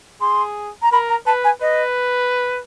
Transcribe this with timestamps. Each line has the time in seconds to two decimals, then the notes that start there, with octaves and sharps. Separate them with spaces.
0.21 G#4 C6
0.82 A#5
0.92 A#4 B5
1.09 A#5
1.26 B4 A5
1.44 G#5
1.61 B4 D#5